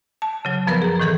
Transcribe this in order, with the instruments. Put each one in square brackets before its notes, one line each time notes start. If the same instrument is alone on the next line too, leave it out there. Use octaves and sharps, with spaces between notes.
[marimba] A5
C#3 F#3
F#2 F3 B3 A#4 B4
G#4 A#5
A2 D#3 E3 A4 G#6